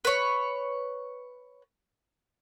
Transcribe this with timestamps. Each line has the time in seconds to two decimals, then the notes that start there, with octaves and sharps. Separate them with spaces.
0.05 B4 C#5